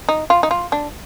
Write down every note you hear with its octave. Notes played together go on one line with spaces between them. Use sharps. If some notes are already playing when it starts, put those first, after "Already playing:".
D#4
F4
D#4
F4
D4